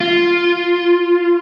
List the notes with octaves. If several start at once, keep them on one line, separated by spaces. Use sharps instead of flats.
F4